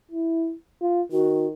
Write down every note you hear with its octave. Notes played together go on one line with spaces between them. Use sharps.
E4
F4
D#3 F#4